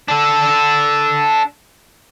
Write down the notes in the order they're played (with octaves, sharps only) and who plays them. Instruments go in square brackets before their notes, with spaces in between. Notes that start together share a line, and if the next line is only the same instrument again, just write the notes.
[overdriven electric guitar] D4 A4